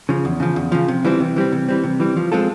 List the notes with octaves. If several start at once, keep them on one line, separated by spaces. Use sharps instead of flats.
C#3 F3
E2
C#3 F3
E2
C#3 F3
C3
E3 G3 C4
C3
E3 G3 C4
C3
E3 G3 C4
C3
E3 G3 C4
F3
G#3 C4 F4 A4